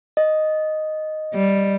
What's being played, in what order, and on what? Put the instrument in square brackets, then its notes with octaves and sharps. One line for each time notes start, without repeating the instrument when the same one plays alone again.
[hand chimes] D#5
[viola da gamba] G3